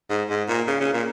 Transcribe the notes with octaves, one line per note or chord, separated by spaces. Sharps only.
G#2
G#2
A#2
C#3
C#3
A#2